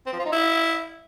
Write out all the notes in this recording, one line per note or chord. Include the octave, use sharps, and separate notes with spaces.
C4
F3
F4
D#4
E4